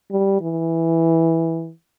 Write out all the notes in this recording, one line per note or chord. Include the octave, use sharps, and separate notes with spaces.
G3
E3